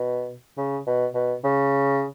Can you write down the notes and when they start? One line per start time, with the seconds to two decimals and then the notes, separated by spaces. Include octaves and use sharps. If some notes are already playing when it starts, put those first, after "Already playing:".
Already playing: B2
0.58 C#3
0.87 B2
1.15 B2
1.44 C#3